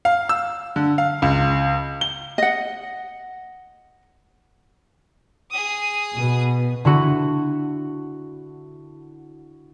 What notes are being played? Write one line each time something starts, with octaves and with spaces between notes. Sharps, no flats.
F5
E6
D3
F5
C#2
G7
D#5 F#5
G#4 D#6
B2 B3
D3 E4 F#4